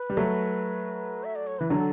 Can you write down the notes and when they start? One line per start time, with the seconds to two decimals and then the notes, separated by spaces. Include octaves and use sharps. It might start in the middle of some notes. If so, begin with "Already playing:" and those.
Already playing: B4
0.10 G3
0.17 F#3 A3
1.24 E5
1.36 D5
1.47 C#5
1.59 E3 B4
1.70 D3 F#3 A4 B4